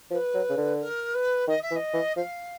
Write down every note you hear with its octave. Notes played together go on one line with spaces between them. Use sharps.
F3 B4
F#3
C#3
D3
A#4
B4
D#3 D#5
E5
E3
D#5
E3
F3 F5